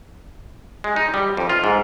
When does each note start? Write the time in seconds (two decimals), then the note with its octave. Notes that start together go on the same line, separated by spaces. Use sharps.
0.84 G#3
0.96 D#4
1.14 G3
1.37 F2
1.49 F4
1.64 G#2